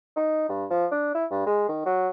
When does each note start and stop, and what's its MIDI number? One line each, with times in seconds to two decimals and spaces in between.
0.16 0.48 63
0.49 0.65 43
0.71 0.86 53
0.92 1.14 62
1.15 1.25 64
1.31 1.45 43
1.46 1.65 56
1.69 1.83 51
1.86 2.09 54